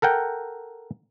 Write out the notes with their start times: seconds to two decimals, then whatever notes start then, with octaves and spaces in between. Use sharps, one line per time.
0.02 A4 A#4 F#5 G5